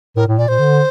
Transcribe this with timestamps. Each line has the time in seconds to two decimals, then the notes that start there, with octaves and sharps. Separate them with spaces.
0.16 A2 A#4
0.27 A2
0.38 A#2 D5
0.48 A#2 C5
0.59 D3